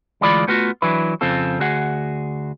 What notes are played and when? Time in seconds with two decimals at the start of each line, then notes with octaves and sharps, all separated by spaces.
0.21 D2 E3 G#3 F4 D5 B5
0.48 A3 B3 F4 F#4
0.82 E3 F#3 D4 E4 B4
1.21 F2 C#3 C4 F4 A4
1.60 D2 F#4 G#4 F#5